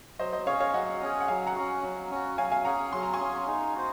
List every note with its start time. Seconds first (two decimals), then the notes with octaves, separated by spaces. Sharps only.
0.19 F#3 C5 D#5
0.33 C5 D#5
0.46 C#4 G#4 C#5 F5
0.60 C#5 F5
0.74 F#3 D#5 F#5
1.02 C#4 G#4
1.20 F#5
1.28 F#3 F5 G#5
1.47 F#5 A#5
1.55 C#4 F#4
1.83 F#3
2.11 C#4 F#4
2.37 F#3 F5 G#5
2.52 F5 G#5
2.65 C#4 G#4 F#5 A#5
2.93 F#3 C6
3.03 A#5
3.14 G#5 C6
3.19 C#4 G#4
3.47 D#4
3.75 F#4 C5